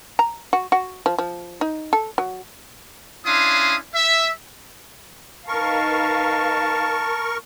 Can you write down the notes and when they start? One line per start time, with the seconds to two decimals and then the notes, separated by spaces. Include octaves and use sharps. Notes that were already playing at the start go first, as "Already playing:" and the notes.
0.19 A#5
0.53 F#4
0.72 F#4
1.06 F3
1.18 F3
1.61 D#4
1.93 A4
2.18 F#3
3.25 C#4 D4 E4 F5 C6 D#6
3.94 E5
5.48 D#4 A#4 B4 F5 A5 C#6